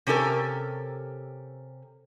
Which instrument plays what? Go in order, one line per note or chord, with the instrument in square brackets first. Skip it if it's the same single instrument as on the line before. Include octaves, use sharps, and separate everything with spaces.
[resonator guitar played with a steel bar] C3 C#4 G4 A4 A#4